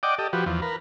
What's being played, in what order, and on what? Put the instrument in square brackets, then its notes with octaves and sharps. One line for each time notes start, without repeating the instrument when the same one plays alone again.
[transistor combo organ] D5 D#5 F#5 G5 D6
G4 A4 D#5
F3 F#4 G4 B4
E2 F3
A#4 B4